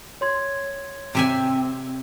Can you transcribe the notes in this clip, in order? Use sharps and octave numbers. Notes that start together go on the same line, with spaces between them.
C#5 C6 G#6
C3 C4 E5 G#5